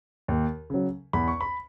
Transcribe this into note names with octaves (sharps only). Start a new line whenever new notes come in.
D#2
C#3 F#3
E2 B5
C#6
B5